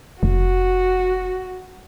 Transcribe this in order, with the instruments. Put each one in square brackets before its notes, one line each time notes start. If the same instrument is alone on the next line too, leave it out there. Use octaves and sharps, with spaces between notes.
[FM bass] F1 [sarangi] F#4